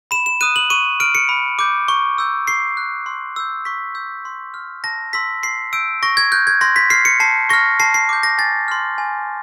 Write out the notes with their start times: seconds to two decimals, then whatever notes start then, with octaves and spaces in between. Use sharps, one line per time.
0.11 B5 E7
0.26 E7
0.41 D#6 F#6 D#7
0.56 F#7
0.70 C#6 D#7
1.00 F6 D7
1.15 C#7
1.29 B5
1.59 D6 G6
1.88 C#6
2.18 E6 G6
2.47 C#6 C7
2.77 F#6
3.06 C6
3.36 E6 G6
3.65 C#6 B6
3.95 E6 G6
4.25 C6
4.54 F6
4.84 A5 A#6
5.13 C6 E6 B6
5.43 C6 C7
5.73 E6 G6 D7
6.03 C#6 A#6
6.17 G#6
6.32 F#6 G6
6.47 G#6
6.61 C6 A#6
6.76 B6
6.90 F6 C7
7.05 C#7
7.20 A5 C7
7.49 C#6 F6 A#6
7.80 A5 C7
7.94 C7
8.09 D6 G6
8.23 A#6
8.38 G#5 A6
8.68 C6 F6
8.98 G#5